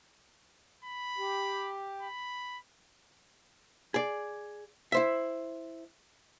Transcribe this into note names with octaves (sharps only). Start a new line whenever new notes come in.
B5
G4
B5
G#4 D5
E4 C5 E5